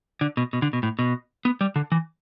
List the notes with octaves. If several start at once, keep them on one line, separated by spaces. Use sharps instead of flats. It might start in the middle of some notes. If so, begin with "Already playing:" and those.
D3
B2
B2
D3
B2
A2
B2
B3
G3
D3
E3